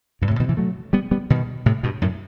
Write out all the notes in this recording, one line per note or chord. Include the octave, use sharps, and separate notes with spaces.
G2 B2
A2 C3
B2 D#3
C3 E3
F#3 A3
G3 B3
G3 B3
B2 D#3
A2 C3
G2 B2
F#2 A2